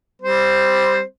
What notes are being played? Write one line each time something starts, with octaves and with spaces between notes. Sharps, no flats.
G3 C4 C5